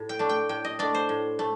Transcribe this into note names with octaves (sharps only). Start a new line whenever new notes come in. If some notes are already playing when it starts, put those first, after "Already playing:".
Already playing: A2
G5
A3 D4
G5
A2 G5
D#5
A3 D4 D5
C5
A2
A3